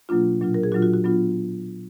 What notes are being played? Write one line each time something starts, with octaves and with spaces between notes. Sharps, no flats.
B2 F#3 A#3 D4 F4
A#2 F#3 D4 F4
A#4
G#4
A#2 F#3 D4 F4 F#4
F#4
F#4
F#3 B3 D4 F4